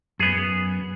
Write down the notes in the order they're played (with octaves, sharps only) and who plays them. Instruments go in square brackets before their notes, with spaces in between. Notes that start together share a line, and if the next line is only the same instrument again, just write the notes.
[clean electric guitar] F#2 [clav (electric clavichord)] B3 G#4